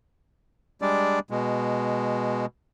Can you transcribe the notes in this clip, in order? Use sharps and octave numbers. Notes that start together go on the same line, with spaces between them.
G3 G#3 D4 D5
B2 G#3